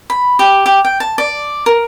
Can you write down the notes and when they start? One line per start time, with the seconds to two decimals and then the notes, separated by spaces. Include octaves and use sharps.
0.10 B5
0.39 G4
0.66 G4
0.85 G5
1.00 A5
1.18 D5
1.66 A#4